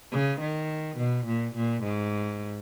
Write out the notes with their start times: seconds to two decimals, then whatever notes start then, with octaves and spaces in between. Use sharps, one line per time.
0.12 C#3
0.41 D#3
0.97 B2
1.26 A#2
1.55 A#2
1.84 G#2